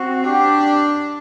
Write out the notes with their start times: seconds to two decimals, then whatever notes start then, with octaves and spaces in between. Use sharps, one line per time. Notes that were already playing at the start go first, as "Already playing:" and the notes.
Already playing: C4 F#4
0.24 D4 G4